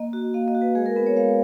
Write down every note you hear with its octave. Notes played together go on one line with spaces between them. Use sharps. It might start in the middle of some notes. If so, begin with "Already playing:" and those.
Already playing: A#3 D#5
F#4
A#3 F5
D#5
F#4
B4
G#3 G#4
A#4
B3 B4
C#5
G#3 F5